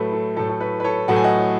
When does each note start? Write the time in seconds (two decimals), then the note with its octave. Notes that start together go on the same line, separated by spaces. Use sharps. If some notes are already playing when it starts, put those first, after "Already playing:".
Already playing: A2 F#3 A3 A4 B4
0.12 A4
0.36 A2 F#3 A3 A4
0.49 A4
0.61 B4
0.80 B4
0.84 A4 C#5
1.08 A2 F#3 A3 F#5
1.16 G#5
1.24 D#5 F#5